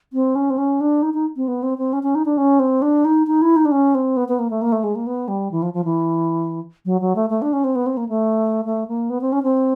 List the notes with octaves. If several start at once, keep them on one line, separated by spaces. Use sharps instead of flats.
C4
C#4
C4
C#4
D4
D#4
D#4
C4
B3
C4
C4
C#4
C#4
D#4
D4
C#4
C4
D4
D#4
D#4
E4
D#4
D4
C#4
C4
B3
B3
A#3
A3
A#3
A3
G#3
A#3
B3
G3
E3
F3
F3
E3
F#3
F#3
A3
A3
D4
C#4
C4
B3
C4
A#3
A3
A3
A#3
B3
C4
C#4
C4